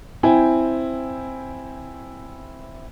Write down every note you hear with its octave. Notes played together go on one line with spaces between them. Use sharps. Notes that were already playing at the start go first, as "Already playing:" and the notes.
C4 E4 G5 G#5